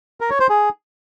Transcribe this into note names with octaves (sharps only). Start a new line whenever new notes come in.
A#4
C#5
C5
G#4